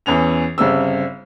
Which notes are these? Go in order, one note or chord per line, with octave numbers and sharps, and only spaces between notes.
E2 E3 C#4 F7
G1 C#3 G3 C4 E6